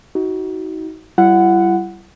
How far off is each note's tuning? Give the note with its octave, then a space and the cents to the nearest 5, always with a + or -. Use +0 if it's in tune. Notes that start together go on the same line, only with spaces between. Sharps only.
D#4 +35 F#4 +15
G3 -25 E4 +40 F#5 +0